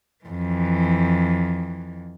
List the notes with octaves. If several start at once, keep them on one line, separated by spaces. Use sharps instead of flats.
F2 E3